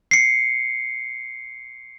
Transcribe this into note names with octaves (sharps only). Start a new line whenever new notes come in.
C7 C#7